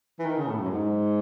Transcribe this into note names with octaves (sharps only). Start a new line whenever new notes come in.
E3
D#3
C#3
A2
F#2
G#2